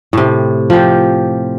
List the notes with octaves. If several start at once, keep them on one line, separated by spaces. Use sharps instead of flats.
A2 C3
F3 G4